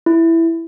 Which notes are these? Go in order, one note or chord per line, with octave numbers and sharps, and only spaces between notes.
E4